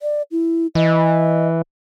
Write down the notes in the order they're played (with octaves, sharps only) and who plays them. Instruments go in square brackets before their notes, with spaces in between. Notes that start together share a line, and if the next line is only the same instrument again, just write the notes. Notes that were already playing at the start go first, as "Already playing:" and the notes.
[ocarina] D5
E4
[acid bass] E3 [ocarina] D#5